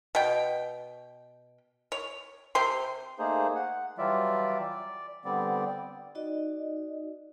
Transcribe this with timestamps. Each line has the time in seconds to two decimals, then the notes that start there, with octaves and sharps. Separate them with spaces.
0.15 B2 G5
1.92 C#5
2.55 C3 C4 C5 C6
3.19 A3 A#3 D#4 G#4 C5
3.55 F#5
3.98 E3 F#3 G3 F4 D5 E5
4.61 D5
5.25 D3 G3 B3 C4 D5
6.15 D#4 F#4 D5 D#5